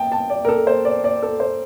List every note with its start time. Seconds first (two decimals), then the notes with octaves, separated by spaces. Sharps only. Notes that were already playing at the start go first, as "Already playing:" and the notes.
Already playing: G5 A5
0.12 A5
0.30 D5
0.45 A#4
0.49 A4
0.67 C5
0.85 D5
1.04 D5
1.23 A4
1.40 C5